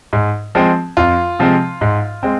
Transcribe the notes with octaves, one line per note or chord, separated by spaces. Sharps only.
G#2
F3 G#3 C4
F2 F4
C3 F3 G#3 C4
G#2
G#3 C4